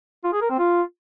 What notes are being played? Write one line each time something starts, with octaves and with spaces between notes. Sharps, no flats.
F4
G#4
A#4
C4
F4